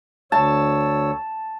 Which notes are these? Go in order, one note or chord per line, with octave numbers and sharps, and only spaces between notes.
D2 C#5 A5 E6